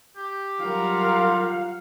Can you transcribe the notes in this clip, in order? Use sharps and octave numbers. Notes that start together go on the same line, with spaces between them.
G4
F#3 G3 F4 A#4 F5 F#5